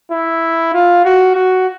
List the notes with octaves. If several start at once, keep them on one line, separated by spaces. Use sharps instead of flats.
E4
F4
F#4
F#4